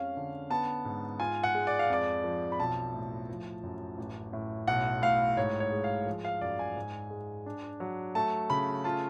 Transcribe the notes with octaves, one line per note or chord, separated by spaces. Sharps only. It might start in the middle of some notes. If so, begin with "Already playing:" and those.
Already playing: F2 G#3 C#4 F5
D3
B3 A5
G#2
F4 G#5
F#5
G#3
D5
F5
F2 D5
F3
B5
B1 A5
A2
F3
F#2
A1
A2
B1 F#5
A2 F5
G#2 C#5
C#5
G#3
F5
F3
F5
F#2 D5
G#5
G#2
G#3
D4
F#3
A3 A5
C#3 B5
F4 A5